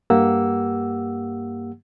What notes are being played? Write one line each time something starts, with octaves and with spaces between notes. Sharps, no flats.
G2 A#3 G4 F#5 E6